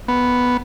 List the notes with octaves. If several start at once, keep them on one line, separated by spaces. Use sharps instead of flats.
B3